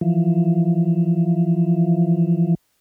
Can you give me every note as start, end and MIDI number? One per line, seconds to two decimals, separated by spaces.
0.01 2.55 52
0.01 2.55 53